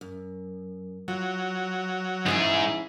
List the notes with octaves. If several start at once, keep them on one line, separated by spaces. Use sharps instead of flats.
F#2
F#3 F4
G#2 E3 C#4 E4 G#4